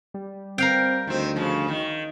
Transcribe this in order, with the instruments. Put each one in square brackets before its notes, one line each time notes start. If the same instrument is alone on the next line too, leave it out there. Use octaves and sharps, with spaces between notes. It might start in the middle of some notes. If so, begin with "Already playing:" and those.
[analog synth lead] G3
[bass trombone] C4 [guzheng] A#4 F5 G5
[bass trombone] D2 [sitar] D#3 C4
[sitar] C#3 F3
D#3